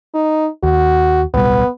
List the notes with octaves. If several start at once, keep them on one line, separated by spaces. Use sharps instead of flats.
D#4
D#2 F#4
D1 B1 G3 B3